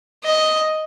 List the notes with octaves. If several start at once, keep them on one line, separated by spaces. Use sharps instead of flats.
D#5